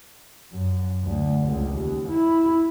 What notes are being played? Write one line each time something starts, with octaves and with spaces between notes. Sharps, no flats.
F#2
D2
C#2
D#2
E4